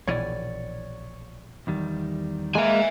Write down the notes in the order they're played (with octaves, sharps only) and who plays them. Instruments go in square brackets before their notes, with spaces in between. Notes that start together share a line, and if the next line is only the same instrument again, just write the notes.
[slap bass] A#1 B2 E3 [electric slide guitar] C#5 D5
[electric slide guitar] E2 D#3 G3
[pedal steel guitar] G#3 A#3 A#4 [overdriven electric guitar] E5 G#5